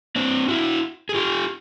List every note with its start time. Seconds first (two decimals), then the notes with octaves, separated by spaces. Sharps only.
0.16 C4 D4
0.48 E4 F#4
1.09 G#4
1.15 F4 G4